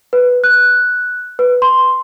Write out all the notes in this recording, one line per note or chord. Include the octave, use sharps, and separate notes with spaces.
B4
F#6
B4
C6